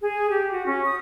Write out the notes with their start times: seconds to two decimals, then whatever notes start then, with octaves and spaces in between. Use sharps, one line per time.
0.02 G#4
0.29 G4
0.50 F#4
0.66 C#4
0.86 D#6